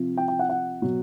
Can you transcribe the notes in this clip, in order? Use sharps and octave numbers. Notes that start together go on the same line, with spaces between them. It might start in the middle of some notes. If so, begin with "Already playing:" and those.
Already playing: C3 F3
G5
G5
F#5
F#5
B2 F#3